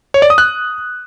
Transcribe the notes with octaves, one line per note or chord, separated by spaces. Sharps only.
C#5
D5
D#6
F#6